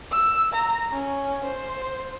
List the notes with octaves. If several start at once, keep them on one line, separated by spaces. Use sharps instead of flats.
E6
A#5
C#4
C5